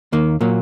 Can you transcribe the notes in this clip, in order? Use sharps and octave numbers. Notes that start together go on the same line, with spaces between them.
D#2 D#3 A#3
A#2 F#3 A#3